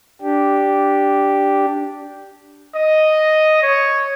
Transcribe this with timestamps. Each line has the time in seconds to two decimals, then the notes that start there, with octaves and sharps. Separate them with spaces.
0.22 D4 G4
2.75 D#5
3.63 C#5